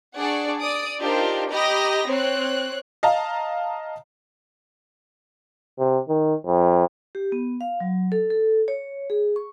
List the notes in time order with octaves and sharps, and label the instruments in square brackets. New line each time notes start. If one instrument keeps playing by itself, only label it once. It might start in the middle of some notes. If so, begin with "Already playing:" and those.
[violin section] D4 G#4 D5 F#5 C#6
D5 D#6 D7
D4 D#4 F4 G4 A#4 C5
G4 D#5 A#5 B5 D#6 A#6
C4 C#5 F#6
[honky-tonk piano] D#5 F5 A5 A#5
[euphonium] C3
D#3
F2
[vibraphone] G4
B3
F5
F#3
A4
A4
C#5
G#4
C#6